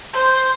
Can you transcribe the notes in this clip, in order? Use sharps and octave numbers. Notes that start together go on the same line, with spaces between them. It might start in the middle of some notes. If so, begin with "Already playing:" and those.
C5